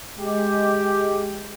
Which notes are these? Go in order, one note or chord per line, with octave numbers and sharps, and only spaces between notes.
G#3 G4